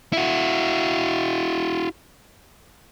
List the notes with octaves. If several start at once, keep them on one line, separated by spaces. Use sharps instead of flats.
E4 F#4